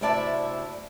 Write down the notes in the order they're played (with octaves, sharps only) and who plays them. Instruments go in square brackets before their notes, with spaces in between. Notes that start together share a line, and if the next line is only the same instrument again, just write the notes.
[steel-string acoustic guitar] D2 C3 E4 D5 E5 A5